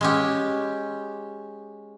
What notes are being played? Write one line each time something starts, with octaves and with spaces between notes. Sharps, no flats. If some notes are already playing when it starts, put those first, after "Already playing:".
G#3 C#4 G4